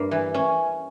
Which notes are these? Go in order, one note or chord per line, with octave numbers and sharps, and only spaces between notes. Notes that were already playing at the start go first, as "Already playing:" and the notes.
Already playing: G2 A#3
E3
C#4